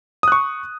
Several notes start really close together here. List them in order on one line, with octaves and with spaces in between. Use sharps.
D#6 F#6 C#6